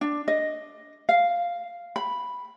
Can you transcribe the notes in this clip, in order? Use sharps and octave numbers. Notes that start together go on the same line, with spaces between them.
D4
D#5
F5
B5